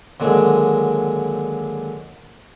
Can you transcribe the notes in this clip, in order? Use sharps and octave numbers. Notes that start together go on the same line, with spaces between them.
D#2 D3 F#3 G#3